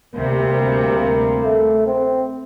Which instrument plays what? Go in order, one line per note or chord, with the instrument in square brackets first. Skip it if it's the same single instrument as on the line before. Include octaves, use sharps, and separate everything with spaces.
[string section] D2 C3 G3 [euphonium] A#3
[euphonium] A#3
A3
C4